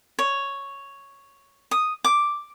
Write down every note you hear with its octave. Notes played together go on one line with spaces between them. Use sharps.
C#5
D#6
D6